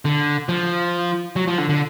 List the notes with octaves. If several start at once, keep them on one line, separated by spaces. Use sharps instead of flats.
D3
F3
F#3
F3
D3
D3